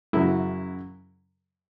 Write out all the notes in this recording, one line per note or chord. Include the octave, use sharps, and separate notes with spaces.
F#2 C#3 F#3 E4